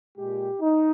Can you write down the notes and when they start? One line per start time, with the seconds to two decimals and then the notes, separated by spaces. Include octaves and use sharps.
0.17 A#2 G#3 G4
0.61 D#4